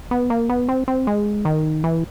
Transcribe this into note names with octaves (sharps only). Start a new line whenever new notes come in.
B3
A#3
B3
C4
C4
G#3
D#3
E3